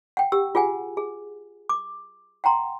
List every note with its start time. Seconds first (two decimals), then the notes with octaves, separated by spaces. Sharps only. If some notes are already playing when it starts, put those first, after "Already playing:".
0.17 F#5 G5
0.32 G4 E6
0.55 F4 G#4 F#5 G#5
0.97 G#4
1.69 D6
2.44 F#5 G5 A#5 C6